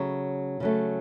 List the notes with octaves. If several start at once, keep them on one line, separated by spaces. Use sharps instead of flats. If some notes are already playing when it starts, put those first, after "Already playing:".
Already playing: C#3 F#3 A3
C#3 F#3 A3